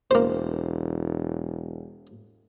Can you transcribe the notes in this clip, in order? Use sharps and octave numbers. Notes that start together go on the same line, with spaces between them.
E1 A#3 C5